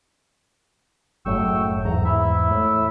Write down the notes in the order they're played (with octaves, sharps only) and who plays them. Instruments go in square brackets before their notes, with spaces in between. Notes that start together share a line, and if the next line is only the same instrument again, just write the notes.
[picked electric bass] F#1 F#2 A2 [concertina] G5 C#6 E6
[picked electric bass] E2 G#2 [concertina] A#5
[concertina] E4 E5
[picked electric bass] A2